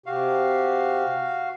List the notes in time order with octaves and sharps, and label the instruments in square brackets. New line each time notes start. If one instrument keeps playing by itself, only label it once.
[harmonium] C3 G4 [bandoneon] F#4 F5